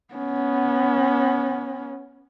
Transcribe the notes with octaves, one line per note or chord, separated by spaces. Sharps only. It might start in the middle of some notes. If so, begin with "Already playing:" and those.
B3 C#4